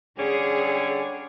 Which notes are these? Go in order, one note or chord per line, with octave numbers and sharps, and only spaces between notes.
D3 G3 C#4 G#4